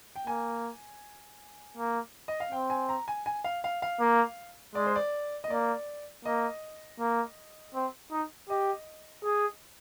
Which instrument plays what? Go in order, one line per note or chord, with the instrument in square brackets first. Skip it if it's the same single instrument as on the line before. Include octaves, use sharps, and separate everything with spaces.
[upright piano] G5
[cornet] A#3 [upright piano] G#5
[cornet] A#3
[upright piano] D#5
F5
[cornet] C4 [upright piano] G5
[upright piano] G#5
A#5
G#5
G#5
F5
F5
F5
[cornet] A#3
[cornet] G#3 [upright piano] D5
[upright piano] C5
D5
D#5
[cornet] A#3 [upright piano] D5
[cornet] A#3 [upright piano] D#5
[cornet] A#3
C4
D#4
[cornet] G4 [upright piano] D#5
[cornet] G#4